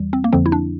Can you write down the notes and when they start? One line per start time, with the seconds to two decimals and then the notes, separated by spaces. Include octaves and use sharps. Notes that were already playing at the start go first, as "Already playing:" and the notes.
Already playing: E2 E3 G3
0.13 C4
0.24 A#3
0.32 F2 D3 F3 C4
0.46 E4
0.52 D4